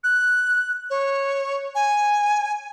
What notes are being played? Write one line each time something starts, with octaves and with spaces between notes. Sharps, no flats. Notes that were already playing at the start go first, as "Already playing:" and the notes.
F#6
C#5
G#5